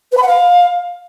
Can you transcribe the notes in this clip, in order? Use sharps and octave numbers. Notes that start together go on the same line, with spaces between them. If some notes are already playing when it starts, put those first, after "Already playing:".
B4
B5
F#5
F5